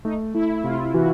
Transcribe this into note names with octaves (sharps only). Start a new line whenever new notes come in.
A3 D#4
A3 E4
C3 F4
E3 F#4